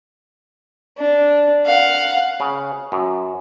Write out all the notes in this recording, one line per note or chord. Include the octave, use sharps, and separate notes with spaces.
D4
F5 F#5
C#3
F#2